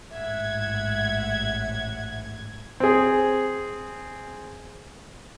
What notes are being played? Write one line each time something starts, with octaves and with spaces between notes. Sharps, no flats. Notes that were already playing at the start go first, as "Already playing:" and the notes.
A1 G#2 E5 F#5 G#6
C4 G#4